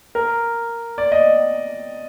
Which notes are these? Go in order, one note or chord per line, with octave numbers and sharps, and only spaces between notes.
A#4
D5
D#5